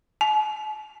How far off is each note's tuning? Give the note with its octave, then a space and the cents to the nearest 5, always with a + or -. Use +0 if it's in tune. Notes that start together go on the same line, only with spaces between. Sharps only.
A5 -45